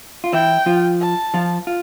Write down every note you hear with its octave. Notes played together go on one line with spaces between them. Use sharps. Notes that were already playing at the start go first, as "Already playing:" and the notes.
F4
E3 E4 G5
F3 F4
A5
F3 F4
F4